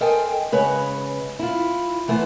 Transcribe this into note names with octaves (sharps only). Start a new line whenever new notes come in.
A4 A#4 C5 D#5 G5 G#5
C#3 G#3 B4 C#5
E4 F4
E3 A3 B3 C5